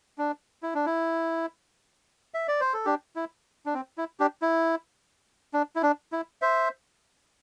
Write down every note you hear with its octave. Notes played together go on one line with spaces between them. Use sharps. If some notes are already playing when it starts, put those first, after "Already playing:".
D4
E4
D4
E4
E5
D5
C5
A4
D4 G4
E4
D4
C4
E4
D4 G4
E4
D4
E4
D4
E4
C5 E5